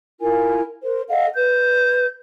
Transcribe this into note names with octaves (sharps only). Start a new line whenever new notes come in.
E4 F4 A#4 G#5
A#4 C5
A4 D#5 F5 F#5
B4 G6